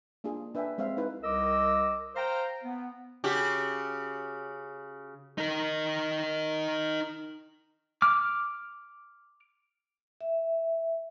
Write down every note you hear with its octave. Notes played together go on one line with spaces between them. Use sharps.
A#3 D4 F4 G#4
D4 B4 E5 G5 G#5
G#3 C4 E5 F5
D#4 E4 B4
C2 A#4 D#5 D6 E6
C5 F5 G5 A#5
B3
C#3 F#4 G4
D#4 A#4
D6 F6
E5